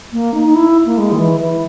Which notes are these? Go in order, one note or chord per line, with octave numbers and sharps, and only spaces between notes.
A#3
D#4
D#4
E4
A#3
G#3
D#3
E3
E3